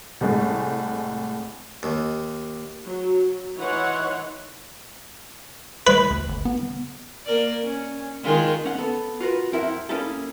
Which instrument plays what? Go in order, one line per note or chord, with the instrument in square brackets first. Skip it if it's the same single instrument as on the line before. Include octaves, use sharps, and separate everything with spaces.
[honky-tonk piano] C2 A2 G#3 A3
[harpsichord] D#2
[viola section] F#3
E3 D#4 E4 C#5 F#5 C6
[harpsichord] B4
[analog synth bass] D2
G1
B3
[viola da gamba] A#3 A#4 D5
C#4
D#3 G#3 F4
[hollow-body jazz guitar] C#4 F#5
B3 A4
F4 F#4 A#4 B4
F2 C4 E4 A#4 E5 F#5
A#3 C#4 D#4 E4 G4 A4